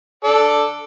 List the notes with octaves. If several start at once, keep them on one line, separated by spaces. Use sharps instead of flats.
A4 D5